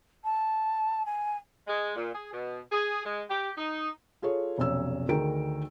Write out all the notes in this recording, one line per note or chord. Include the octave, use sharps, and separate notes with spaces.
A5
G#5
G#3
A#2
G#4
B2
G#4
G#3
G4
D#4
F4 G#4 A4 C#5
F1 B1 C#4 E6
D2 D#3 G#4 A#4 G5 D7